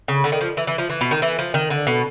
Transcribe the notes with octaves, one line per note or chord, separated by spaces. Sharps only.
C#3
D3
D#3
F3
E3
E3
F3
E3
B2
D#3
E3
F3
D#3
D3
B2